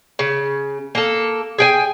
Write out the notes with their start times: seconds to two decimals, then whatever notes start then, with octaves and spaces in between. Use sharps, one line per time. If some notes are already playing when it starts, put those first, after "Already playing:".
0.19 C#3
0.95 A#3 A4
1.58 G#4 G5 G#5